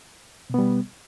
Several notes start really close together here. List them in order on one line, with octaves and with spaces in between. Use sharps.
B2 B3 G3